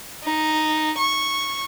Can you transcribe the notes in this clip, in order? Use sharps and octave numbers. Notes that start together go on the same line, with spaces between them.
D#4
C#6